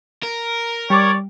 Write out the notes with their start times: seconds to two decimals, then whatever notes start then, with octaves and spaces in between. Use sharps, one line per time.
0.23 A#4
0.90 G3 C#5 D5